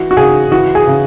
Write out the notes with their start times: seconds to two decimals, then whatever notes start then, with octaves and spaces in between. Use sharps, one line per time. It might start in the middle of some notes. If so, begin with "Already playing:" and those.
Already playing: E3 F#4
0.11 F#4
0.17 C#3 G#4
0.52 E3 F#4
0.75 G#4
0.87 C#3